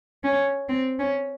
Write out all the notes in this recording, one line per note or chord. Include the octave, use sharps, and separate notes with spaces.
C#4
C4
C#4